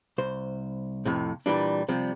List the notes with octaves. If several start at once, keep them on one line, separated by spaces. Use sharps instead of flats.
C2 C5
F2 A2 C3
A#2 E3 G3 D4
C3 F3 G3